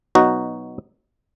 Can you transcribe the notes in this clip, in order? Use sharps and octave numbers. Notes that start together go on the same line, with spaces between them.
B2 F#3 D#4 F#4